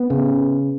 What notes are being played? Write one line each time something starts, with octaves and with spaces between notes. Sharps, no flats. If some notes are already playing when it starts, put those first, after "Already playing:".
Already playing: B3
C#3